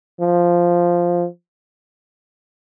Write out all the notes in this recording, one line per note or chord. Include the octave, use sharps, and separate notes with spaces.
F3